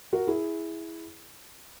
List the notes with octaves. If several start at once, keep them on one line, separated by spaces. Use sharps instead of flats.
F#4 A#4
E4 G#4